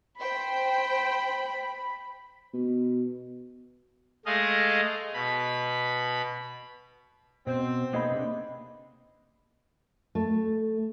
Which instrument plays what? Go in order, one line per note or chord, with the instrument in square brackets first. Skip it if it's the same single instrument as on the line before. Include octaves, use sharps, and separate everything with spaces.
[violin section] C5 G5 [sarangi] B5
[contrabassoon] B2
[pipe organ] G#3 A3 G#4 D#5 F5
B2 B5
[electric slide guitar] B2 [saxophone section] C4
[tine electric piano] A#3 D#5 B5 [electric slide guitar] B3 D#4 G#4
[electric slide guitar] C3 D4
[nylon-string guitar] A3